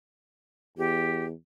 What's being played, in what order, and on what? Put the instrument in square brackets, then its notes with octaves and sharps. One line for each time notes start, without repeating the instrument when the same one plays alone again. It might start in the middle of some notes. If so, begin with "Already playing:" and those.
[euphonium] E2 [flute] G4